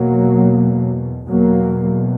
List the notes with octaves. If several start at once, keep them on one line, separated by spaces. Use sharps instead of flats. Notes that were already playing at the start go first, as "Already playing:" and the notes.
Already playing: E2 B2 F#3 A#3
E2 B2 F#3 A#3